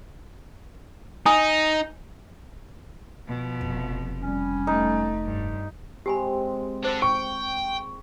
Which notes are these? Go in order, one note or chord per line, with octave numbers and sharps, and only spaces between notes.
D#4 G#5 A#5 D#6
B2 F3
F1
G3 C#4
A3 D#4
G2
G#3 C4 G4 G#5 B5
D4 A4 C5
G5 C#6